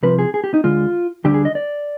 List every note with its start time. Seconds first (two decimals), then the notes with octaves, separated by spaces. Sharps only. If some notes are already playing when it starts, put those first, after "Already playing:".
0.03 C2 C3 F3 B4
0.19 G#4
0.34 G#4
0.44 G4
0.54 D#4
0.64 D2 D3 G#3 F4
1.24 D2 D3 G3 D4 G4
1.34 G#4
1.45 D#5
1.55 D5